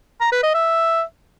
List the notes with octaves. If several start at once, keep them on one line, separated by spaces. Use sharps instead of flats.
A#5
B4
D#5
E5